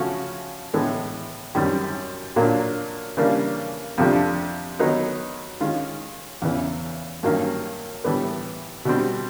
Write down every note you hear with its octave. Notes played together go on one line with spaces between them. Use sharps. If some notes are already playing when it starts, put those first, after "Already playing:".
Already playing: C#3 F3 A3 C#4 F#4
A2 E3 G#3 B3
F#2 D#3 G3 C4
A#2 F#3 A#3 D4
C#3 E3 G3 A#3 D4
F2 C3 F3 A3 D4
D#3 F#3 B3 D#4
D#3 G#3 C#4 F4
E2 C#3 E3
G2 D#3 F#3 A#3 C#4
A2 E3 G3 B3
B2 G3 C4